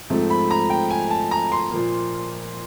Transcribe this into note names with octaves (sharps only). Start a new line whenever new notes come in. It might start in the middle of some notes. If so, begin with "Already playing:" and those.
G#2 F3 A3 C4
B5
A#5
G5
G#5
A5
A#5
C6
A#2 F3 A#3